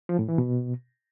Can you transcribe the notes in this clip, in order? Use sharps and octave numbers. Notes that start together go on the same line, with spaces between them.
F3
A2
E3
B2